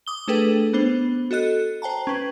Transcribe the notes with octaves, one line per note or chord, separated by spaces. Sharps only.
D6 D#6 G7
A3 D4 G#4 A4 B4 G5
B3 D4 C5
F#4 A4 D#5 F#6
C5 G5 A5 A#5
C#4 B4